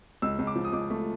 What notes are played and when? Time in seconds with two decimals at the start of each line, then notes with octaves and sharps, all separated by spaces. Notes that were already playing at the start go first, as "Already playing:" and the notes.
0.22 C#2 E6
0.39 C#2
0.47 D6
0.56 F3
0.65 D#6
0.73 C#2 D6
0.90 A3